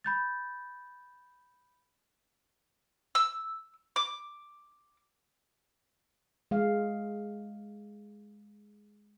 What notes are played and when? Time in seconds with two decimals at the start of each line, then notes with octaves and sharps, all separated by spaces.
0.04 B5 G6 A6
3.15 E6
3.96 D6
6.51 G#3 F5